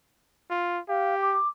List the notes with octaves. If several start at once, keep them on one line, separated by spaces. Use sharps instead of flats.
F4
G4 F5
D6